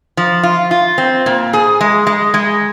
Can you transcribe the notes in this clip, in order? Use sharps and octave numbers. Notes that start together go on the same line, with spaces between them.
F3
F4
F4
C4
A#2
G#4
G#3
G#3
G#3